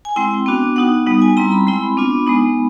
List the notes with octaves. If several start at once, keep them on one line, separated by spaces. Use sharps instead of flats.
G#5
G#3 C4 E4 G5
B3 D4 F#4
B3 D#4 F#4 F#5
G3 B3 D#4
G#5
G3 C4 E4 A#5
B5
G#3 C4 E4 B5
B3 D4 F4
G#3 B3 D#4